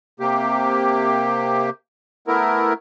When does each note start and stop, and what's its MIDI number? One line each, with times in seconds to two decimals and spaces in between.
0.20 1.70 48
0.20 1.70 58
0.20 1.70 67
2.27 2.73 57
2.27 2.73 59
2.27 2.73 64
2.27 2.73 70